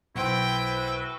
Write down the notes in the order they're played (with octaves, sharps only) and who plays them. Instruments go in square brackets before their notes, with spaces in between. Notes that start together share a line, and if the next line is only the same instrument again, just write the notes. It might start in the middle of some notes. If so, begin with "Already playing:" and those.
[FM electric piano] B1 C5 [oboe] E4 [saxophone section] F#4 A4 B4 [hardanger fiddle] G5